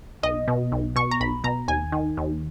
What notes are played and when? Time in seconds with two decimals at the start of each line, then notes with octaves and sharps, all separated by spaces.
0.23 B1 D#5
0.48 B2
0.72 B1
0.96 B2 C#6
1.11 A#5
1.20 B1 B5
1.44 B2 A#5
1.68 D#2 G#5
1.92 D#3
2.17 D#2